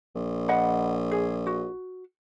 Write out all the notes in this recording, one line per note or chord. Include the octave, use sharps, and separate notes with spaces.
A#1
D#5 F#5 B5
G#4
F#4